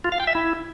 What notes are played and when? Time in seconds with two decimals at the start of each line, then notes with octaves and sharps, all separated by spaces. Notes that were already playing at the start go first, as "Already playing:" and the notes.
0.04 F4
0.12 F5
0.20 G5
0.27 E5
0.35 E4